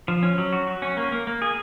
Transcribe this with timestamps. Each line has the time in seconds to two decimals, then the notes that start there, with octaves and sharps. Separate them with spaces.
0.08 F3
0.23 C#4
0.38 F#3
0.53 F#4
0.68 F#4
0.82 C#4
0.97 A#3
1.12 A#3
1.27 A#3
1.42 G#4